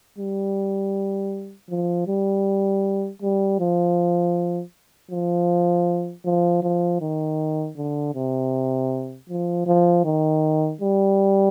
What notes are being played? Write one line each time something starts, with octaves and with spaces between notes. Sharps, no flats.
G3
F3
G3
G3
F3
F3
F3
F3
D#3
D3
C3
F3
F3
D#3
G3